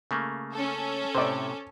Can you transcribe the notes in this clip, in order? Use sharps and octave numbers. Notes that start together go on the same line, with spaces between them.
C#3 A3 A#3
C#4 A4
A2 C3 C5 D5